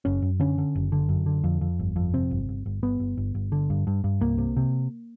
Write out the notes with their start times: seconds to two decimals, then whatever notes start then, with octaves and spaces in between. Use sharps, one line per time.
0.05 F#1 C#4
0.22 F#2
0.40 D3 C#4
0.58 D3
0.75 F#1
0.92 D3
1.09 F#2
1.26 D3
1.44 F2
1.61 F2
1.79 G1
1.96 F2
2.13 C3 C4
2.31 G1
2.49 G1
2.66 G1
2.83 G1 B3
3.00 G1
3.17 G1
3.35 G1
3.52 D3
3.70 G2
3.87 G2
4.04 G2
4.21 C2 A#3
4.38 C3
4.57 C3